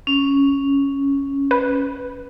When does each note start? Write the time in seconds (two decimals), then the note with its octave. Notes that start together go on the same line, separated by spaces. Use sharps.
0.07 C#4
1.51 B4